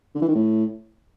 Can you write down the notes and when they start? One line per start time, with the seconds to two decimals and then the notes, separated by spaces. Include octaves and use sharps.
0.15 D3
0.22 E3
0.28 D#3
0.35 A2